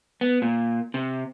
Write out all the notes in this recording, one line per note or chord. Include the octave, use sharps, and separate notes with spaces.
B3
A#2
C3